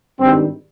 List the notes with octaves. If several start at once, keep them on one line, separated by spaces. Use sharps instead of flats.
G#1 G2 D#3 G3 C4